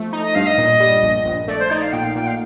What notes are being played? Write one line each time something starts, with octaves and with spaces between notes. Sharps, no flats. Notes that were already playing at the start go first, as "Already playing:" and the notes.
Already playing: F3 A3
D#4
D#5
G2 F5
D#5
A#2
G3
A#1
A#1
A3 D5
C5
D#4 D5
F5
A#2 G5
F5
A#2 G5
F5